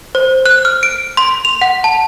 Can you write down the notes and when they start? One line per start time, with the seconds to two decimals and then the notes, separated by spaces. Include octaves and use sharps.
0.15 C5
0.46 F#6
0.65 F6
0.83 D7
1.17 C6
1.45 F7
1.61 F#5
1.84 A5